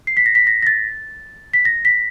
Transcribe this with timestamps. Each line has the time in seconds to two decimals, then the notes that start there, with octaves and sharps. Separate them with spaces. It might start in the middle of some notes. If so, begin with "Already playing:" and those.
0.07 C7
0.17 B6
0.26 A#6
0.35 B6
0.47 A#6
0.62 A#6
0.67 A6
1.53 B6
1.65 A#6
1.85 B6